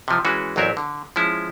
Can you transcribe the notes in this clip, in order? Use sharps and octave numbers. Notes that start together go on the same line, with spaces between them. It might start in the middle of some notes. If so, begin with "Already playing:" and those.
C3 F3
E3 G#3 C#4 F#4
A1 E2 F#3 C4 A#4 E5
D3
F3 G#3 C#4 E4